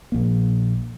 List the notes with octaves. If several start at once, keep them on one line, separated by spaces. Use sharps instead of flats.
A#1 A#3